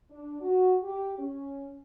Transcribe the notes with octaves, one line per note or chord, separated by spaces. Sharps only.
D4
F#4
G4
C#4